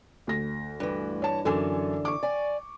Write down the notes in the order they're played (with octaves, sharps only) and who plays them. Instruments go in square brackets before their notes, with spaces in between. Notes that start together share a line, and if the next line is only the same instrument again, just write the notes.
[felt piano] D2 A#6
[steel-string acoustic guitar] G2 E3
[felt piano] C#5 A5
[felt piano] F#2 A4 G#5 [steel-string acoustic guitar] D3 E3
[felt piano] C#6 D6
[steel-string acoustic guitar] D5 G#5